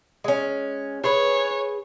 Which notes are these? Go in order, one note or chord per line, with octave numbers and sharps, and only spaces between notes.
G#3 C#4
G#4 B4 C#5